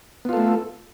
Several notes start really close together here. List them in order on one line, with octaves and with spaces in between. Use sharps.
B3 F4 A4 A3